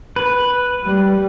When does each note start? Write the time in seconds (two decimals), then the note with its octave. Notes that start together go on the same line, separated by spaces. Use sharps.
0.16 B4
0.84 G3